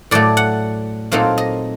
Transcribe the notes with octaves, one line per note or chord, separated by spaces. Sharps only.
A2 F#3 A3 D5
F#5
A#2 F#3 A3 C4 D#4 F5
D#5